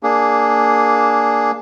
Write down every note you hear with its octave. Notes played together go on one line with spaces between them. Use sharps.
A#3 D4 G#4